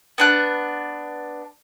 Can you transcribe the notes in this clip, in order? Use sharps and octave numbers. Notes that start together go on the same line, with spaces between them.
B3 D4 F#6